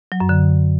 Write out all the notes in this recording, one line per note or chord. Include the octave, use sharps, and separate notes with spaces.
F#3
F#2
D3